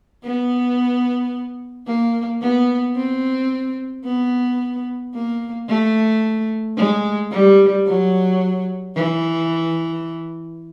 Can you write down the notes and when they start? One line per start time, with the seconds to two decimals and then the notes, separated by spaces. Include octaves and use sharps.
0.24 B3
1.87 A#3
2.41 B3
2.96 C4
4.04 B3
5.14 A#3
5.68 A3
6.77 G#3
7.31 G3
7.86 F#3
8.95 E3